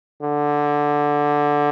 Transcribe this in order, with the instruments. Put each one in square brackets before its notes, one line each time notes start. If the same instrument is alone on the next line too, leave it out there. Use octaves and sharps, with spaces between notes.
[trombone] D3